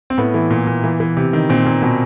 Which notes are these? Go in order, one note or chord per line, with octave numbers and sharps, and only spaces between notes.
C4
A2 B3
E3
A#2
A#2
E3
E3
C3
D#3
A#2 C4
A#2
B2